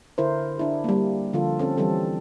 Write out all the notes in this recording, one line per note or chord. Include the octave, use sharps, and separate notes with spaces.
D3 E4 A#4 C5
D4 E4 G#4
G3 A#3
D3 F3 F4 A4
C4 C#4 A4
E3 G3 C4 A4